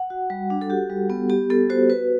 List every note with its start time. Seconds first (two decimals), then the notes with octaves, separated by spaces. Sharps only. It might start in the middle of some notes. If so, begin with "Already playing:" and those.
Already playing: F#5
0.10 F#4
0.30 G3
0.50 D4
0.61 A4
0.70 F#4 G4
0.90 G3
1.10 B3
1.30 B3 G4
1.50 B3 A4
1.70 F#4 C5
1.90 F#4 B4